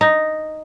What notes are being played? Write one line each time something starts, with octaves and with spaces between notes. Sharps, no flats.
D#4